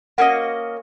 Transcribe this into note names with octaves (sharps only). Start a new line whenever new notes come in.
A#3 C#4 F#4 D#5 F#5